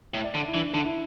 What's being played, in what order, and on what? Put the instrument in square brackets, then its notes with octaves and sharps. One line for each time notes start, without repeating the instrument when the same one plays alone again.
[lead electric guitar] A2
[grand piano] E5
D5
[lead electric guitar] D3
[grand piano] E4
[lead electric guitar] E3 [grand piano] D4
[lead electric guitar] D3 [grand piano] D4
[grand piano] E4